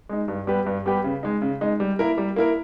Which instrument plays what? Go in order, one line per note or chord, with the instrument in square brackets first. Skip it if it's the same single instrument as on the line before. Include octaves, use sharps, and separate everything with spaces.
[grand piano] G#3 D#4
G2
G3 B3 G4 B4
G2
G3 B3 G4 B4
C#3
G#3 D#4
C#3
G#3 D#4
G3
A#3 E4 A#4
G3
A#3 E4 A#4